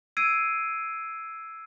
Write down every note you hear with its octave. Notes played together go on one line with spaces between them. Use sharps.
E6 G#6 C7 D7 D#7